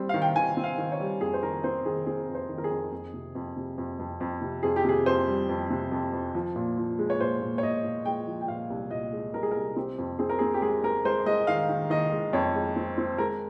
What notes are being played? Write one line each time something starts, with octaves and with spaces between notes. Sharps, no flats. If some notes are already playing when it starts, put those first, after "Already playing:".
Already playing: G3 C4
D#3 F5
G5
D#3 G#5
C4
F5
D#3
C#5
G3
F2 G#4
C5
D#3 A#4
C4 C5
D#3 G#4
C4 G#4
F2
C5
D#3
A#4
G#4
F2
F2
C3
F2
C3
F2
F2
F2
C3
F2 G#4
G4
C3 G#4
F2 C5
G3
F2
C3
F2
F2
F3
A#2
F3
G#3
C#5
A#2 C5
A#2
C#5
A#2 D#5
A#2
G#3 G5
F3
G5
A#2 F5
C2
A#2 D#5
G#3
C2 A#4
G#4
A#4
C2
C4 G4
F2
C4 G#4
A#4
C4 G#4
G4
G#3 G#4
G#3 A#4
G#3 C5
G#3 D#5
D#3 F5
D#3
D#3 D#5
G#3
F2 C#5
G#3
C4
C4
G#3 A#4